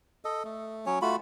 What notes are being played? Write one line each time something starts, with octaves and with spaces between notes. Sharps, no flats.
A4 D#5
A3
F#3 C#4 C#5
A3 F4 F#4 B5